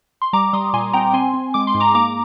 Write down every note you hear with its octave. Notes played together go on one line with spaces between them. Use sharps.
C6
G3 A#5 D6
G3 C6 D#6
A#2 G#5 C6
C4 G5 A#5
C4 G#5 C6
C4
G#3 D6
C6
G#2
A#5 D6
A#3 A#5 D6